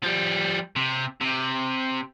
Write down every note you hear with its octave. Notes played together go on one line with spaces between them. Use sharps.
F3 G3
C3
C3